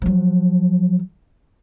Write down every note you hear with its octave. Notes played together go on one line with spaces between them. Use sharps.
F3 F#3